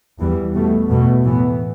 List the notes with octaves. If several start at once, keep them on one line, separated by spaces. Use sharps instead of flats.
E2 E3 G3
B2 A3
E2 B2 A3
A2 E3 B3